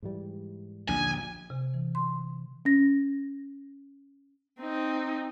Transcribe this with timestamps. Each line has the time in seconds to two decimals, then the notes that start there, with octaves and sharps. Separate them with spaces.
0.02 G#2 E3 G3
0.89 A#1 D#2 D3 G#5
1.50 C3
1.74 E3
1.95 C6
2.65 C#4 A#6
4.60 C4 D#4